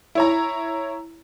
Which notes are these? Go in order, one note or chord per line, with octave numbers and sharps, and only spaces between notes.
E4 C#5 A#5